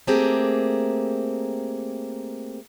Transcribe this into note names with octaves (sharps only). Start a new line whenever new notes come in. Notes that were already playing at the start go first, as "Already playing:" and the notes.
A3 A#3 C4 G4 G#4